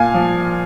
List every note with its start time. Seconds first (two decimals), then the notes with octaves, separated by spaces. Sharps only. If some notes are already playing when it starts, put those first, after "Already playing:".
Already playing: A#2 F5 G#5
0.14 F3